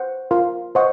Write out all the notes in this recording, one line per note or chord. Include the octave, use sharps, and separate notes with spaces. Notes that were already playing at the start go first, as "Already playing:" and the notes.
Already playing: C5 F#5
F4 A#4 F5 C6
C5 D#5 F#5 C#6